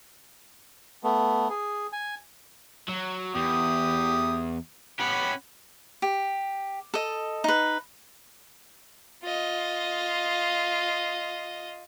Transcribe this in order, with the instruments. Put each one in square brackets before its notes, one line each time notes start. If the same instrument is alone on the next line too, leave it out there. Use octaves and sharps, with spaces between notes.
[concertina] A3 B3
G#4
G#5
[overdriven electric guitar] F#3
[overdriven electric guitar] E2 [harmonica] G4 D#6
[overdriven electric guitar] C#4 G4 [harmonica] F#5 B5
[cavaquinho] G4
A4 D#5
D#4 B4
[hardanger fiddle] F4 D#5